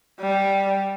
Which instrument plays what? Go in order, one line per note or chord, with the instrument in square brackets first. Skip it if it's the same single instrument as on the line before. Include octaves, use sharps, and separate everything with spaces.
[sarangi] G3